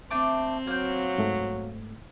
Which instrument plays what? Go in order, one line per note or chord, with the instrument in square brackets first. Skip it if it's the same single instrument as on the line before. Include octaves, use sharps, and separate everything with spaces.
[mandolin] A3 D4 D6 [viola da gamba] C4
[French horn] F#3 [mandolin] A#3 G6
[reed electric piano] G#2 A3